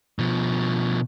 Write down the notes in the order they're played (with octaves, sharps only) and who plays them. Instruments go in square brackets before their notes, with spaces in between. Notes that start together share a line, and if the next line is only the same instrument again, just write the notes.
[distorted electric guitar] B2 F3